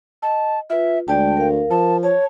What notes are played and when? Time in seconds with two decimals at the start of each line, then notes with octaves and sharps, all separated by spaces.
0.22 D#5 A5
0.70 F4 B4 E5
1.08 D2 G#3 D5 G5 A5
1.37 A#4 F5
1.71 F3 A5
2.03 C#5 A5